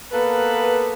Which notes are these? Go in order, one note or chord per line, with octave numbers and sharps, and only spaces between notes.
A#3 B3 A4 B4